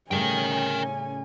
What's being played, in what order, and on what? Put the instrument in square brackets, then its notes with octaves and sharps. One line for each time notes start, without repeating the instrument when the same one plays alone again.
[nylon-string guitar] A2 C#3 G3 [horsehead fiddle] C#4 G#5 [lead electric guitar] A#4 G5